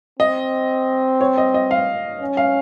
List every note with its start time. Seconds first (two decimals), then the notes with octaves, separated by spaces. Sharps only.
0.19 C4 D#5
1.21 C#5
1.38 D#5
1.54 D#5
1.71 F5
2.21 C#4
2.37 F5